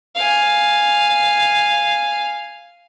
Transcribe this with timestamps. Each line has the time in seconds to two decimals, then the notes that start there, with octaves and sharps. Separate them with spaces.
0.15 F5 G#5